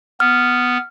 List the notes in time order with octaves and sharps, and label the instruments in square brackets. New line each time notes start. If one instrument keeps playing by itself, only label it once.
[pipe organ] B3 [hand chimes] F6